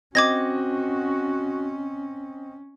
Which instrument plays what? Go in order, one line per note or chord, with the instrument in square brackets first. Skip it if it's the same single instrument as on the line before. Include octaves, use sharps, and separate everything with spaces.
[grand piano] C4 D#5 [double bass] C#4 [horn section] F#4 [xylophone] D6 G#6 A#6